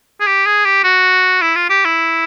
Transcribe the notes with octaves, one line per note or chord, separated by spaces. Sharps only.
G#4
G4
G#4
G4
F#4
E4
F4
G4
E4